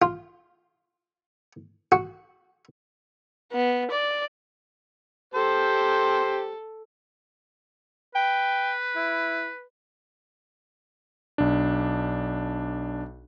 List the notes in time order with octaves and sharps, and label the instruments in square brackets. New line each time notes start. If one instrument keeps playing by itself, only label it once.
[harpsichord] F4
F#4
[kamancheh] B3
D5
[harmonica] G4 C5 [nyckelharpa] A4
[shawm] B4 [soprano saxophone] G5
[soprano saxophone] E4
[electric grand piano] B1 D4